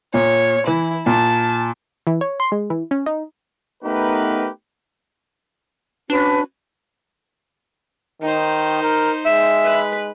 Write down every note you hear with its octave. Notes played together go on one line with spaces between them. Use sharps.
A#2 C#5
E3 E4
A#2 A5
E3
C#5
C6
G#3
E3
C#4
D#4
A3 B3 D#4 G4 A#4 B4
C#4 D4 F#4 B4
D#3 D#4 C5
A#4
G#3 E5
B4 B5